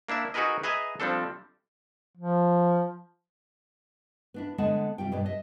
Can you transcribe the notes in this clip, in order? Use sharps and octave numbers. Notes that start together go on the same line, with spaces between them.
A#3 D4 E4 E5
D#4 F#4 G#4 A#4 B4 D#5
G#4 B4 D#5 E5 G#5 A#5
F3 G3 C4 D4 A4
F3
B3 D4 E4
D3 G#3 B3 F#5 A5
C3 G3 F4 G5
G2 B2 B3 D5
D#5 E5